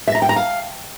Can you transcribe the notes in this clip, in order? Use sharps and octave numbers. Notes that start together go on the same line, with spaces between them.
E5
A#5
G5
A#5
F5